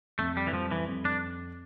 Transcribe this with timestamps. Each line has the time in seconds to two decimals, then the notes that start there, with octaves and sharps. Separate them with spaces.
0.19 F2 A3
0.37 G3
0.47 E3
0.53 F3 G3
0.71 E3
0.88 F2
1.05 D4